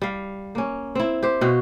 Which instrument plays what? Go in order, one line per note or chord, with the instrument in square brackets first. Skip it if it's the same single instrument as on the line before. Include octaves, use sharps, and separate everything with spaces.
[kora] G3 F5
A#3 C#4
C4 E4
G4 C5
B2 F#4 F5 G5